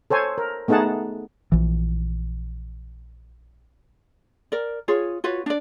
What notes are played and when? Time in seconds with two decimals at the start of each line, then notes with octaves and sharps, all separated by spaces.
0.10 A4 C5 C#5 G#5
0.38 A#4
0.68 A3 B3 D#4 G#4 F#5 A5
1.52 A#1 E3
4.52 A#4 D5
4.88 F4 G#4 C#5
5.24 F4 F#4 B4 C#5
5.46 D4 D5